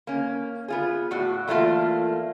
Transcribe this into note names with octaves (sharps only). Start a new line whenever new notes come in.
A#3 C#4
B3 F4 G#4
A2 F#4 D5
E2 A3 A#3 D#4 F4 D5